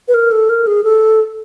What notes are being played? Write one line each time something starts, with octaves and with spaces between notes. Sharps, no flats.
B4
A#4
A4
A#4
G#4
A4